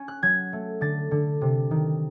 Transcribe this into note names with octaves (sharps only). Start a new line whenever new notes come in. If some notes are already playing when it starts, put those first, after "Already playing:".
Already playing: C#4
F#6
F#3 G#6
A3
D3 A6
D3
C3
D#3